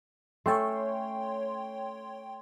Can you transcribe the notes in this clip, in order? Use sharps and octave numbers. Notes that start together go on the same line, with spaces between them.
A3 C#4 A4 C#5 G5 C6